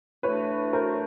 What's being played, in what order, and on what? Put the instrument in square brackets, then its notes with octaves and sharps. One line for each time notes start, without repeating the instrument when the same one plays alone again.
[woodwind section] A2 E3 A3 D4 F#4 [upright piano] B4 C#5
[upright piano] A#4 C5